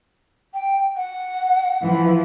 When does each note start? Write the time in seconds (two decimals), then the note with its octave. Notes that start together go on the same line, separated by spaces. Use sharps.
0.54 G5
0.97 F#5
1.83 E3 F3